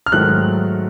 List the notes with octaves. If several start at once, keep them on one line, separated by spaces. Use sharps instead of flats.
F6
G#2 D#3 F#3 A3 F#6